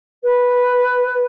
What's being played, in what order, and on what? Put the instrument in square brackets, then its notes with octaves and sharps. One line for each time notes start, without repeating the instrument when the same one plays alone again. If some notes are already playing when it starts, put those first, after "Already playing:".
[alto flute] B4